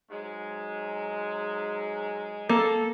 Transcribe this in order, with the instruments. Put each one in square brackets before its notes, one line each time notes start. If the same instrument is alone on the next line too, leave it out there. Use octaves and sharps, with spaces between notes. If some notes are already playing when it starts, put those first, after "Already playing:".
[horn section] G#2 F#3 G#3
[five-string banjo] A#3 [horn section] A4